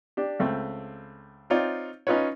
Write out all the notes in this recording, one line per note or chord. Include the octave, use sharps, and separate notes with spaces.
D4 G4
C#2 A3 C4
C4 D#4 F4 C#5 D5
C#4 D#4 F4 B4 C#5